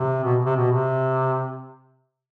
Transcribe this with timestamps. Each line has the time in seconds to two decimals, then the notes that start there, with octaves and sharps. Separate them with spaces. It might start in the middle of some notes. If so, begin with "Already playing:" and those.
Already playing: C3
0.24 B2
0.45 C3
0.56 B2
0.72 C3